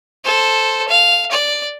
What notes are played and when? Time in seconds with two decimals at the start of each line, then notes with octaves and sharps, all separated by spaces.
0.25 A4 C5
0.88 F5
1.31 D5